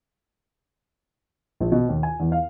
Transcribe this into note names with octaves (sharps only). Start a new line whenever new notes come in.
A#1
B2
D#2
G#5
E2
F5